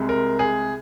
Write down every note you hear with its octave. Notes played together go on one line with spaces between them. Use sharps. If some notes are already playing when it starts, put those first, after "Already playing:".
Already playing: C2 C3 G#3
A#4
G#4